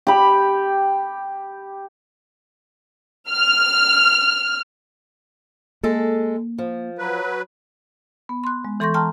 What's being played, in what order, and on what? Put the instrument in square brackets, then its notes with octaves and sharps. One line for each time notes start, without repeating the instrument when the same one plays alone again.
[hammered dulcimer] G4 B5
[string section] F6
[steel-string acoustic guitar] G#3 A4 [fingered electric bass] A#3
[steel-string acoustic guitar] F3
[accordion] F#3 B4
[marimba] B3
C6 F#6
G#3
E3 A4 C6 C#6 G6 A#6
G5 A5 A#5 C6 F6